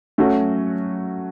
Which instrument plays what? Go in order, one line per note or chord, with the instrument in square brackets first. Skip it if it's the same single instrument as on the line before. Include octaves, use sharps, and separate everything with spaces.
[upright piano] F#3 A3 C#4 F#4